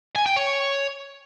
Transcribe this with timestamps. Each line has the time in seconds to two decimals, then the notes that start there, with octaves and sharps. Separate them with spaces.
0.16 G#5
0.26 G5
0.36 C#5